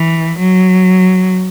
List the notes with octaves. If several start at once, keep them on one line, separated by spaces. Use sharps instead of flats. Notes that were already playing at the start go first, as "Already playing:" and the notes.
Already playing: E3
F#3